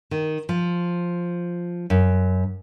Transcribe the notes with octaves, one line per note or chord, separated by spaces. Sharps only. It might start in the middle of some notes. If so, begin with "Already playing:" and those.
D#3
F3
F#2